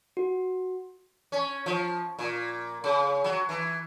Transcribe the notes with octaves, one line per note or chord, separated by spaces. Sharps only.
F#4
C#4
F3
A#2
C#3
F#3
E3